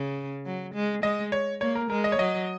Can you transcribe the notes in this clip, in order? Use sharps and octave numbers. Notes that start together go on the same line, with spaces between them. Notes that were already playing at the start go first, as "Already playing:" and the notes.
Already playing: C#3
F#3
G#3
G#3 D#5
C#5
A#3 C#5
A#4
G#3 A#4
D#5
C#5
F#3 D#5